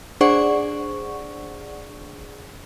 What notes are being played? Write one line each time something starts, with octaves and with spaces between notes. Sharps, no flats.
D4 G#4 C5 D5 F#5 C#6